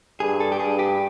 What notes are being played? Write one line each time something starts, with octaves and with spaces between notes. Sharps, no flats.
G2 G#4
A4
G4
G2 G#4
G4